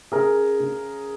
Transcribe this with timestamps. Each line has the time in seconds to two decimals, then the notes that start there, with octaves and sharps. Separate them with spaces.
0.12 C#3 G#4 A#4
0.60 C#3